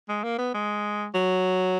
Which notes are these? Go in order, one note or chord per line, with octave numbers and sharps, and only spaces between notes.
G#3
A#3
B3
G#3
F#3